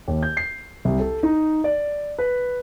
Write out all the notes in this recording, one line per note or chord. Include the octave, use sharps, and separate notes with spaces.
D#2
G6
C7
C2
A4
D#4
D5
B4